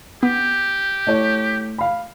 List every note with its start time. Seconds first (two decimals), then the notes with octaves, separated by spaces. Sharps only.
0.23 B3 G4
1.07 A3 E4 C#5
1.78 F5 B5